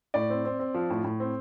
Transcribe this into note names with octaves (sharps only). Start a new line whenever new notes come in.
A2 D5
C4
C4
C4
F3
A2
A2
C4